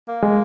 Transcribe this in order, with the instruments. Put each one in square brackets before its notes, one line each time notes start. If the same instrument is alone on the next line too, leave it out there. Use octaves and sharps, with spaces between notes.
[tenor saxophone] A#3
[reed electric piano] G#3